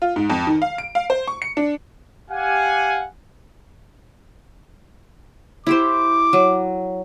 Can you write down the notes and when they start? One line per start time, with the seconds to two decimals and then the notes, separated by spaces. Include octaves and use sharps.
0.02 F4
0.16 G#2
0.30 F2
0.47 D#3
0.62 F5
0.78 D7
0.95 F5
1.10 C5
1.27 C#6
1.42 C#7
1.57 D4
2.30 G4 F5 F#5 G#5
5.67 E4 G4 C5 D6
6.33 F#3